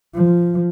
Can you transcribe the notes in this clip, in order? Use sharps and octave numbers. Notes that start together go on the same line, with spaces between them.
F3